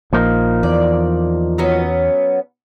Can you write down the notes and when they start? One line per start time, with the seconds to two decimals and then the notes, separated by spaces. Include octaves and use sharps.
0.13 A#1 A#2 F3 A#3 D#4
0.63 E2 D5
1.58 F#3 B3 C#4